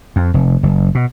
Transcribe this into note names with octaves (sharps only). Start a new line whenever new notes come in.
F2
F1
F#1
B2